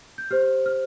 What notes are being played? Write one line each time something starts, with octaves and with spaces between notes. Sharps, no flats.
G6
G4 C5 F6
F6